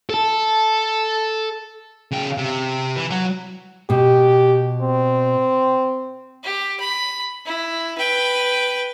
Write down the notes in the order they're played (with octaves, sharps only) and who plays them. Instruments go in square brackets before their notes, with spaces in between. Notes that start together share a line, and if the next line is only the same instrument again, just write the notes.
[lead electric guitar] A4 A5
[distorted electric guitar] C#3 G5
C3
E3
F#3 F#4
[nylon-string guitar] B2 [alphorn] G4
[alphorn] C4
[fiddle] G4
B5
E4
B4 G5